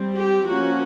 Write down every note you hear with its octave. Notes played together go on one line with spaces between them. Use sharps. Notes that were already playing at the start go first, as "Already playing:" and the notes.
Already playing: G3 C4
G4
F3 A#3 C#4 F#4